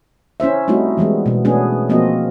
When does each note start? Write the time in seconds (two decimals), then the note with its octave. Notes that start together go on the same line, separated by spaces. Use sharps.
0.40 C#4 E4 C5 E5
0.68 G3 A3 C4 D#4 E4 F#4
0.97 E3 G3 G#3 B3
1.26 B2 B3
1.45 A3 B3 C#4 D4 G#4
1.89 F3 A#3 C4 F4 F#4 D#5